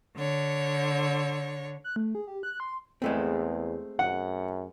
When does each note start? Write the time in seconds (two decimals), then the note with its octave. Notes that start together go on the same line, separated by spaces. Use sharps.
0.16 D3 C#5
1.84 F#6
1.96 A3
2.15 G#4
2.27 G4
2.43 F#6
2.60 C6
3.02 E2 G#3 A3 C4
3.99 F#2 F#5